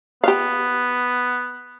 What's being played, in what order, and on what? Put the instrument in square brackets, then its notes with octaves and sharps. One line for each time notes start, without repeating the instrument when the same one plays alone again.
[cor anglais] B3 [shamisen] G4 F5